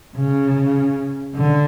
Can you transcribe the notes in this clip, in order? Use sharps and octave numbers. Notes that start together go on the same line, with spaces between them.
C#3
D3